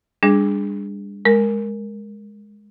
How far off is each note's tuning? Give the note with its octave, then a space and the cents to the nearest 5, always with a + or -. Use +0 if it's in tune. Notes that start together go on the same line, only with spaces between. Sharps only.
G3 +40 D4 +0 G#4 +0
G#3 +0 A#4 +0